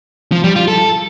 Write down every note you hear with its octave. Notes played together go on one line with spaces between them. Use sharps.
F3
G3
F4
A4